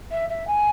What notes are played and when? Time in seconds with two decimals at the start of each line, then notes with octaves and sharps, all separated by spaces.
0.11 E5
0.29 E5
0.47 G#5